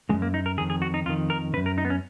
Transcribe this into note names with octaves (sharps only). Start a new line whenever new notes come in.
C#3 G#3
F#2
A#3
D#4
A#4
F2 D#3 G#4
G#4
F#4
D#4
F2 D#3 F4
A#4
C#3 B4
F#2
A#4
D#4
B3
C#4